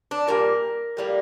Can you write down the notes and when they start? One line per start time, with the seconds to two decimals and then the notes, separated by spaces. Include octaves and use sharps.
0.11 D4
0.28 A#2 G3 A#3 A#4
0.97 A2 G3 A#3